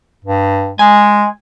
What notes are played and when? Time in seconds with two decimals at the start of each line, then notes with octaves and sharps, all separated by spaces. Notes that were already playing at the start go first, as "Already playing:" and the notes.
0.24 G2
0.79 G#3 G#5